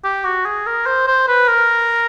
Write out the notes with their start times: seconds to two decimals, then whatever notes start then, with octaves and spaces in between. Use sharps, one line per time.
0.04 G4
0.24 F#4
0.45 G#4
0.66 A#4
0.86 C5
1.07 C5
1.28 B4
1.48 A#4